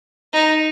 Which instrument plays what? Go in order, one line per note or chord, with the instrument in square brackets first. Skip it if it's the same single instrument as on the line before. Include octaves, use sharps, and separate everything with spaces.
[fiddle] D#4